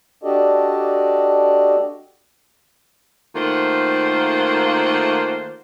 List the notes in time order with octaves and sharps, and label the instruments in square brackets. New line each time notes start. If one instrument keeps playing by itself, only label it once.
[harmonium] D4 F#4 G4 A4 D5 D#5
[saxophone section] D#3 A3 A#3 F4 C5 F#5